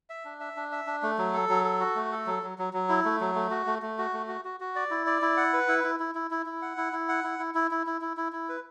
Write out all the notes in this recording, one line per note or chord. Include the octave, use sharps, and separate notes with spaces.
E5
D4
E5
D4
E5
D4
A3
F#3
A4
F#3
A4
F#4
A3
A4
F#3
F#3
F#3
F#3
E4
A3
F#3
A3
F#4
A3
A3
F#4
A3
F#4
F#4
F#4
D5
E4
D5
E4
F#5
B4
E4
E4
E4
E4
E4
E4
F#5
E4
E4
F#5
E4
E4
E4
E4
E4
E4
E4
E4
B4